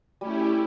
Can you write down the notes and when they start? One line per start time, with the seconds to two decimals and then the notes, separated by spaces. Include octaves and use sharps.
0.21 G3 A3 C#4 E4 G4
0.36 G3